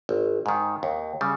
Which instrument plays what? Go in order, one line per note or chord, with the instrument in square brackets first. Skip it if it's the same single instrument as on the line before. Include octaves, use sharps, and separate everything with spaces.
[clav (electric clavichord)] G#1
G#2 D#3
D#2
C#3 G3